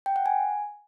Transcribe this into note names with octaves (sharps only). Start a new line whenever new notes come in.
G5
F#5
G#5